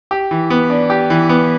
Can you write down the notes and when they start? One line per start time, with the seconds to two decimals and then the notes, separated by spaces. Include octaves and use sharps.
0.11 G4
0.31 E3
0.50 B3
0.70 D4
0.90 G4
1.10 E3
1.29 B3